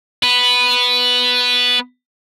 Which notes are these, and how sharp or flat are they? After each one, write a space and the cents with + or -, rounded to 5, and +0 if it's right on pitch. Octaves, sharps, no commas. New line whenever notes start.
B3 +0 B4 +0